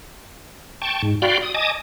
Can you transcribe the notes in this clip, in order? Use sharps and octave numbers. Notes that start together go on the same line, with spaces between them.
G5 A5 C#6
G#2
F#4 D5 F5 G5 B5 C6
D#6
D#5 G#5 A5 D6 D#6